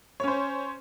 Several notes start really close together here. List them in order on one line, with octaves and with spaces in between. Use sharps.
C#5 C#4 C5